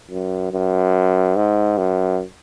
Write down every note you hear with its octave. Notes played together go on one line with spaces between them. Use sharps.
F#2
F#2
G#2
F#2